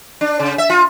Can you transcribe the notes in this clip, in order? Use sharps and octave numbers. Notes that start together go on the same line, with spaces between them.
D4
C#3
E5
F4